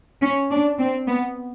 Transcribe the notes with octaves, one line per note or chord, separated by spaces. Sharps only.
C#4
D4
C4
B3